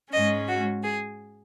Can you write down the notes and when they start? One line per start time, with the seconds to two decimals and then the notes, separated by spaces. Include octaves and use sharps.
0.12 G#2 G#3 C#4 D#5
0.48 F#4
0.83 G#4